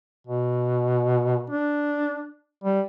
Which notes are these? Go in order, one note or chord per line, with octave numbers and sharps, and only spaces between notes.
B2
D4
G3